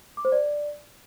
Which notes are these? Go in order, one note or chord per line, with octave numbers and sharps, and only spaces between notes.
D6
C5
D5